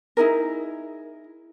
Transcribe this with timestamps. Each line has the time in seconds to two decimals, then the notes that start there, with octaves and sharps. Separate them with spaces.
0.17 D#4 E4 G#4 A#4